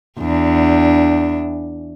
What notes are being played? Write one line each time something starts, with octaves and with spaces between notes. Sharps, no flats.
E2 D4